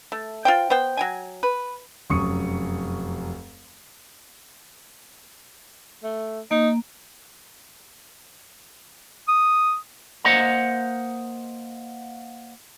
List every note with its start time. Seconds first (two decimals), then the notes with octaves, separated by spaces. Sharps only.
0.12 A3
0.45 F4 C5 G5
0.70 B3 C5 G5
0.97 F#3 G5 G#5
1.43 B4
2.10 F1 F#2 C#6 D#6 C#7
6.03 A3
6.51 A#3 D#4
9.28 D#6
10.25 A#3 C5 D#5 F#5 A#5